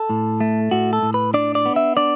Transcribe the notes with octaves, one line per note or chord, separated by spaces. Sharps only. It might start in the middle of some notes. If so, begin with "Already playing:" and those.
Already playing: A4
A2
A3
A2 F#4
A4
A2
B4
D4 D5
D5
B3
E5
D4 D5